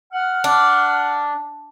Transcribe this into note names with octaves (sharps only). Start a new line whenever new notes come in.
F#5 F6
D4